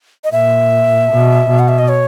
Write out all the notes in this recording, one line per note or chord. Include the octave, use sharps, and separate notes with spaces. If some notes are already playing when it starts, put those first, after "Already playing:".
D#5
A#2 E5
B2
B2
F#5
E5
D#5
C#5